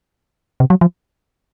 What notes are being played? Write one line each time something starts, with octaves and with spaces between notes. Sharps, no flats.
C3
F#3
F3